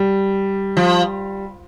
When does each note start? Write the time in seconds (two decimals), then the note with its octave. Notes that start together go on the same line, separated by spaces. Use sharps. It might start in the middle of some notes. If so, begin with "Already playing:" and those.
Already playing: G3
0.77 F3